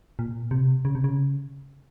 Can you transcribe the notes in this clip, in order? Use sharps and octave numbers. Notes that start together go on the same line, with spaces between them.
A#2
C3
C#3
C3
C#3